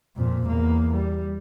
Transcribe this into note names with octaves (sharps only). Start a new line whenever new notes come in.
F2 A#2
E2 A#3
G3